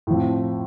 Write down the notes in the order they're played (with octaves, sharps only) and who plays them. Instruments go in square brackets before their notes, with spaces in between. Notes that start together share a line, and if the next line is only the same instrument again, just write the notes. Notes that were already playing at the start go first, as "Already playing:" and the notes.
[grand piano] A2 F3 C4